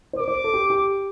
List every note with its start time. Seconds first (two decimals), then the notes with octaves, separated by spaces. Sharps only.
0.13 C5
0.19 A#4 D6
0.28 C5
0.44 A4
0.53 G4
0.70 G4